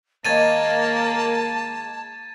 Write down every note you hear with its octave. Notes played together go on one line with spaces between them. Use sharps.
D#3 G#3 A#3 C#5 A5 G#6 A6 D#7